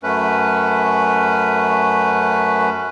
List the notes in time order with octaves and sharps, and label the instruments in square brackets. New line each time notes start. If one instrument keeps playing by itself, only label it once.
[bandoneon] F#2 A3 C#4 B4